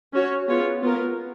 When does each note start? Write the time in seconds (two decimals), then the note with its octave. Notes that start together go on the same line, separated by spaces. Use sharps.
0.13 C#4 F#4 C#5
0.47 B3 F4 G#4 C#5
0.82 B3 F4 A#4